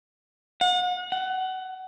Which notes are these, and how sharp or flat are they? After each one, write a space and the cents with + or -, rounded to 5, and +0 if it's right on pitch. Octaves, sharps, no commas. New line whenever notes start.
F#5 -40
F#5 +25